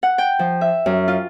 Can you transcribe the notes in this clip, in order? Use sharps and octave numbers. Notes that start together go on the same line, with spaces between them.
F#5
G5
F3
E5
F#2
F4